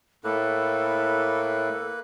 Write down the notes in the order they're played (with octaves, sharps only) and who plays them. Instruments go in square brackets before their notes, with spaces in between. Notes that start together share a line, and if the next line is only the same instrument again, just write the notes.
[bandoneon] A2 [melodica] A#3 B4 [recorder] A4